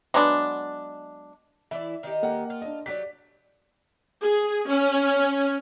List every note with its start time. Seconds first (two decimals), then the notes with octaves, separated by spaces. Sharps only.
0.14 F#3 G#3 B3 D4
1.71 E3 E4 D5 E5
2.03 D#3 D#4 G4
2.23 A#3 F#5 G5
2.50 F4
2.62 D4 D#5
2.86 F#3 G4 D5 B6
4.22 G#4
4.69 C#4